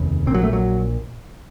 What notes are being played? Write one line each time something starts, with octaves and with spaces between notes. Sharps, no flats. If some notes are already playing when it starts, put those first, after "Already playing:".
Already playing: F1 D#2 C#3
A#1 A#2 C4
F#3
A3
F#3